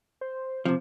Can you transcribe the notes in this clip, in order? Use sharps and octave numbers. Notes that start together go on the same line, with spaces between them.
C5
C3 F3 C4